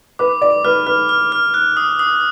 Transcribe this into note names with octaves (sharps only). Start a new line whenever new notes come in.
B4 D6
D5 D6
B4 F6
B4 F6
F6
F6
F#6
D#6
D#6